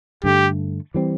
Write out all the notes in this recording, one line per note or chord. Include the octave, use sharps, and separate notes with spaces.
G2 D3 A3 G4
E3 G3 C4